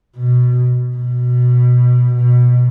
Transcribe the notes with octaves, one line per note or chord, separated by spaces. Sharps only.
B2
B2
B2